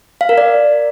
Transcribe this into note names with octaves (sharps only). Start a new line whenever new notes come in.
F5
A#4
D5